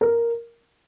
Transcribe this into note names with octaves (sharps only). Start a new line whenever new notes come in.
A#4